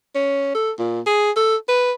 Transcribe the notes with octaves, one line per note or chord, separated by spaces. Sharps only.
C#4
A4
A#2
G#4
A4
B4